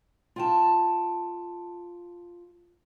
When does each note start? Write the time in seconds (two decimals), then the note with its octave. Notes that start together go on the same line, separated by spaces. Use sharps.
0.36 F4 G5 A5